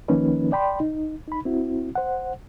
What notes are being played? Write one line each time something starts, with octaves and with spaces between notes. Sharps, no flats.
D#3 F3 A#3 C#4 D#4 B4
D5 G5 B5 C6
D#4
D#4 B5
C4 E4 F#4
C5 F#5